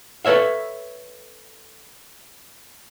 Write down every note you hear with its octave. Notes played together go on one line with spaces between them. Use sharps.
A4 B4 C#5 E5 F5